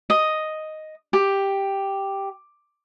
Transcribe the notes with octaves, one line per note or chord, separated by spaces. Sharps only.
D#5
G4